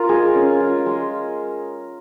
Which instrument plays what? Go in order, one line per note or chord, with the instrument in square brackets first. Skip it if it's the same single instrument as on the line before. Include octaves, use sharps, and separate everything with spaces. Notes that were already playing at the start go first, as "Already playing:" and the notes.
Already playing: [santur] F4 A#4
G#3 G#4
C#4
F4
G#3